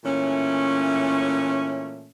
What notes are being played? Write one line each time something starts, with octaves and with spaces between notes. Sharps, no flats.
A#2 E3 A3 C#4